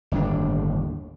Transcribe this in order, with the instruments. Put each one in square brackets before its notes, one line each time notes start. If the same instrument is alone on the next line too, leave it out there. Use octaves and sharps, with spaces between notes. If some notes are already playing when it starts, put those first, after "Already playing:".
[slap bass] G1 D#2 A2 D4